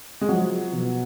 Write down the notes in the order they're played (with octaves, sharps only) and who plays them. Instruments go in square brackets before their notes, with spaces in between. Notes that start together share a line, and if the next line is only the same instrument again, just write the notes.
[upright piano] G#3
[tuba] F3 [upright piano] F#3
[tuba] B2